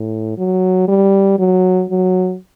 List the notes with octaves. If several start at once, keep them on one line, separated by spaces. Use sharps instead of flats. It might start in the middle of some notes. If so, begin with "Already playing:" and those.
Already playing: A2
F#3
G3
F#3
F#3